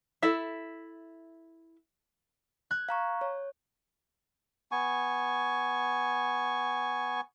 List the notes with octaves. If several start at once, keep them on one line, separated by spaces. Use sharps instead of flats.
E4 A4 E5
F#6 G#6
F5 A#5 C#6
C#5
B3 G#5 C#6